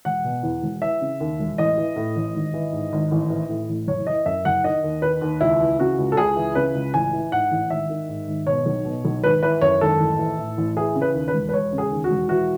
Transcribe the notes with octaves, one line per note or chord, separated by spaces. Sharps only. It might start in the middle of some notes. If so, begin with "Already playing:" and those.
E1 F#5
B2
E2
E1
E3 E5
C#3
D#2
E1
A1 D#5
E3
A2
A1
G#1
E3
G#2
G#1
A1
E3
A2
A1
F#1 C#5
E3 D#5
F#2 E5
F#1 F#5
D#3 D#5
D#2
D#3 B4
D#2
C#2 E4
E3
C#3 F#4
C#2
A4
C#2 G#4
E3
C#3 B4
C#2
A1 G#5
E3
G#2 F#5
A1
G#1 E5
D#3
G#2
G#1
B2 C#5
B1
B2
B1
G#1 B4
E3 B4
F#2 C#5
G#1 A4
A1
E3
A2
A1
E3 G#4
C#3
B4
D#2
B4
E1
B4
E1 C#5
C#3
G#4
D#2
F#4
E1
E3 F#4